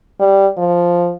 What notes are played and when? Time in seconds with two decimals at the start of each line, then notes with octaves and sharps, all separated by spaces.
0.20 G3
0.58 F3